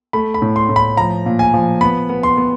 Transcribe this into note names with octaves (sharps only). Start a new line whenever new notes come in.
A3 B5
B5
A2
C6
A2
B5
F3 A#5
A#2
G#5
F3
B3 B5
B3
C6
B3